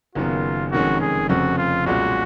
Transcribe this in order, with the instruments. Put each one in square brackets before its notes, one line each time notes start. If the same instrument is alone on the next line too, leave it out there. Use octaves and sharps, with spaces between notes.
[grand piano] F#1 F#2 D#3 F#3 B3 [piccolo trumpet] F4
[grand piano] F1 F2 D#3 G#3 C#4 [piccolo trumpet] F#4
[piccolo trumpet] G#4
[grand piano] F1 F2 C#3 F3 [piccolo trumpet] F#4
[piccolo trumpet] F4
[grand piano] B1 A#2 G#3 C#4 F4 [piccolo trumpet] F#4